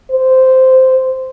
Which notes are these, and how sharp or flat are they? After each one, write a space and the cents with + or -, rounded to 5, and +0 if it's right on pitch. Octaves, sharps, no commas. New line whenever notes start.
C5 -10